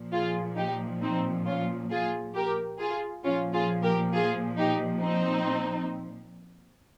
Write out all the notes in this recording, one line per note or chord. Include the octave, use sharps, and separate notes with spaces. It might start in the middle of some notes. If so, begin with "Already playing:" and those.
Already playing: A#2 F3
F4 G#4
D#4 G4
C4 D#4
C#4 F4
F4 G#4
G4 A#4
F4 G#4
A#2 F3 C#4 F4
F4 G#4
G4 A#4
F4 G#4
D#4 G4
C4 D#4